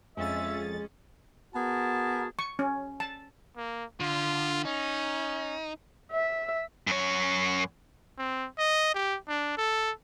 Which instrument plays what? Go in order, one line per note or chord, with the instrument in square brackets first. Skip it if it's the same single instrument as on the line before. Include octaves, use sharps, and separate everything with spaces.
[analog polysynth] F2 A6 [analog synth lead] G#3 [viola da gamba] C#4 G#4 [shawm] E5
[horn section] B3 F#4 G#4 A#4 A5
[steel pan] C#6
C#4
A5
[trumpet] A#3
[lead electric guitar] D3 [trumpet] F4
[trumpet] C#4 [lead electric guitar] D#4
[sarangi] E5
[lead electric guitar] F#2 C#5
[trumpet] C4
D#5
G4
D4
A4